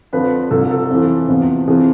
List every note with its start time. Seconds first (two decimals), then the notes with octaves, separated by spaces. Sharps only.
0.13 F2 D3 F3 B4
0.51 C2 C3 F3 A4
0.71 A4
0.90 F2 E3
1.29 E2 C3 F3
1.67 F2 C3 E3 G#4